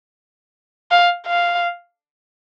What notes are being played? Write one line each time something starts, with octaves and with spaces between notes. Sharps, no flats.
F5
F5